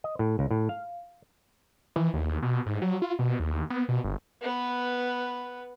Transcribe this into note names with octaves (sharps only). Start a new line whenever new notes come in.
D#5
A2
C#2
A2
F5
E3
D#2
B2
G#2
F#3
F4
B2
D#2
B3
B2
G1
B3 B4